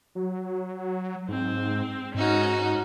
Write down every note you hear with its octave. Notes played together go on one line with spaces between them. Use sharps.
F#3
G#2 C4
G#2 C#4 D#4 F#4